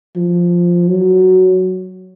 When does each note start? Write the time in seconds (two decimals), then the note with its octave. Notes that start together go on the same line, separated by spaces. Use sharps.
0.16 F3
0.88 F#3